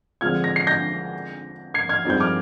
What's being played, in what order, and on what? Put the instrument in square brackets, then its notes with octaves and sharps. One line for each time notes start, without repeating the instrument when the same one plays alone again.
[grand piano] D3 F3 G#3 C4 F4 [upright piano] F6 G#6
[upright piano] A#6
C7
G6 A#6
G#6 C7
F6 G#6
[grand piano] G2 F3 G#3 C4 D#4 [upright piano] G6
[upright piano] D6 F6